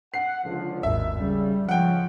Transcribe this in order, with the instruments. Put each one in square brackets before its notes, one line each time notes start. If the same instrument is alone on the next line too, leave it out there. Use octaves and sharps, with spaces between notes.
[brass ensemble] F#5 [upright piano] C7
[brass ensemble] C#2 D3 F3
[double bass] G#1 D#2 [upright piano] E5
[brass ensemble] C#3 [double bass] G3
[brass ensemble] C#2 C#3 [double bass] F3 [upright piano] F#5 G5